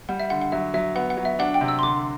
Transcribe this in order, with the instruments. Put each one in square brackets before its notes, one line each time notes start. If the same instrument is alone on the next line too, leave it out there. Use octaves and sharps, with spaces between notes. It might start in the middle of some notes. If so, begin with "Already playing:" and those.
[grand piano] G3 [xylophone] F#5
[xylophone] E5
[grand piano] D3 [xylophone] F#5
[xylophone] F#5
[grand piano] F#3 [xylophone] E5
[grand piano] F#3 [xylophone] E5
[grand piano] B3 [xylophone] F#5
[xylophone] F#5
[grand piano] F#3
[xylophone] E5
[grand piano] D4 [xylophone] F#5
[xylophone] G5
[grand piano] C3
[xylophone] E6
C6
[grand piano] D3 [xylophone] D6